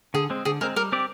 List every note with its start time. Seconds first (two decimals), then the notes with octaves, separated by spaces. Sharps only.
0.14 D3 G#4
0.30 G#3 C4
0.45 D3 G#4
0.61 G#3 C4 A#4
0.76 G3 A#4
0.92 C4 G4 D5